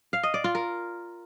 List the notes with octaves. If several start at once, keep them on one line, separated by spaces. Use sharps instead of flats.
F5
D#5
D5
F4
A#4